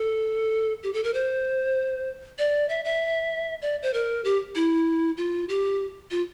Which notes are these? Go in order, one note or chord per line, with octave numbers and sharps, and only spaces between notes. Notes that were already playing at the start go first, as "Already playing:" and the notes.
Already playing: A4
G4
A4
A#4
C5
D5
E5
E5
D5
C5
A#4
G4
E4
F4
G4
F4